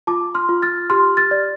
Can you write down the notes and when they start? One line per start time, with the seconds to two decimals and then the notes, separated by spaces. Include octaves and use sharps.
0.07 F4 A5 D6
0.35 C6 F6
0.49 F4
0.62 F6 A6
0.90 G4 C6 F6
1.17 F6 A6
1.31 D5